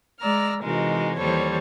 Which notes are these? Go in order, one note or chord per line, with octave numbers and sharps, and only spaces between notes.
G#3 D5 A#5 E6 F6
C3 E3 G#3 D#4 F#4 A#4
D#2 E3 G3 A4 C5 C#5